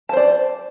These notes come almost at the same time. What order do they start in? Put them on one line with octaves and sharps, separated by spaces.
A5 C5 D5